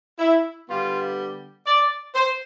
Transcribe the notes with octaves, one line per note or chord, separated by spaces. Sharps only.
E4
D3 G3 B3 F4
D5
C5